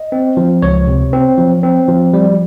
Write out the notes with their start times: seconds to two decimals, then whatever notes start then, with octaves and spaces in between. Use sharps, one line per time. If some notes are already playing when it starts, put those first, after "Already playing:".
Already playing: D#5
0.12 C4
0.37 F3
0.62 C#2 C#5
0.87 C3
1.13 C4
1.38 F3
1.63 C4
1.88 F3
2.13 G3